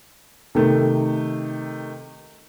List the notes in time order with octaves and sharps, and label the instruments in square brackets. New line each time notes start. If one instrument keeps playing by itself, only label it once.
[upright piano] C3 D#3 A3